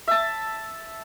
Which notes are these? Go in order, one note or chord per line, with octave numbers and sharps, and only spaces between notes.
E5 A5